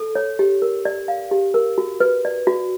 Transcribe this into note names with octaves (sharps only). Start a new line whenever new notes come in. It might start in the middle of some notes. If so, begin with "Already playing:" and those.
Already playing: A4
C#5
G4
A#4
D5
F5
G4
A#4
F#4
B4
D5
F#4